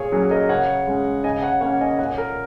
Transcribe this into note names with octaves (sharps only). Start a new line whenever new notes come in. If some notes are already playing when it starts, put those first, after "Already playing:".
Already playing: A#2 G#4 C#5
F#3 A#3 C#4 G#4 C#5
A#4 D#5
C#3 C#5 F#5
G#3 C#4
C#3 D#5 G#5
G#5
C#5 F#5
A#3 C#4 C#5 F#5
D#5 G#5
A#2 C#5 F#5
A#4